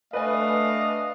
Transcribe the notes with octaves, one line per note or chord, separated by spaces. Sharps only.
A3 D4 B4 D5 D#5 F5 G#5